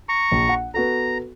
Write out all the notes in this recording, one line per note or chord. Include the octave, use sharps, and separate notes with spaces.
A#5 C#6
A#1
F#5
B3 F#4 A4 A#5